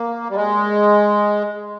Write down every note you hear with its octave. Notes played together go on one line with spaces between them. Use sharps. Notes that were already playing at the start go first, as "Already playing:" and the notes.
Already playing: A#3
G3
G#3